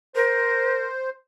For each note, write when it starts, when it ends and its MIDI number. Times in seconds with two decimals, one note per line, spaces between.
0.15 0.87 70
0.15 1.10 72